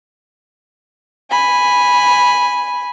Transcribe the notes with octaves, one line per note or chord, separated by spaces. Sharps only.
G#5 B5